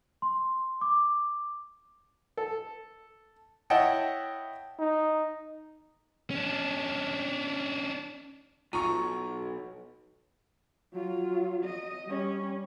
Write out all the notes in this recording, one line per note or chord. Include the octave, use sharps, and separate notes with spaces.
C6
D6
A4
E4 C#5 D#5 F#5 G5 A5
D#4
C#4 D4
B1 F4 A#5 C#6
F#3 F4
D#5
G3 C#4